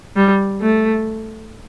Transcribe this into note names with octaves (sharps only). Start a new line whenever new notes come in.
G3
A3